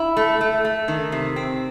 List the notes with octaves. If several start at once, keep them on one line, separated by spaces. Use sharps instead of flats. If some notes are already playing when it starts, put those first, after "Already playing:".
Already playing: E4
A3
A3
A3
D#3
C3
C4